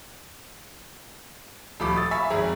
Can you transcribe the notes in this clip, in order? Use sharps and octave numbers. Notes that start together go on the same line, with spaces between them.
D#1 F3 A3 B5 D6
D#6 E6 A6
E5 F5 G#5 B5 C#6
G#1 F2 G#4 A#5